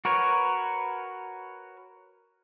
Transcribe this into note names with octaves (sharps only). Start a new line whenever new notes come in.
F#4 A#4 B4 C#5